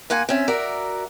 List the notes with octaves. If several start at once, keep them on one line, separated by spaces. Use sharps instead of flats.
A#3 F4 F#5 G#5
C4 C#4 E5
F#4 A#4 D5 E5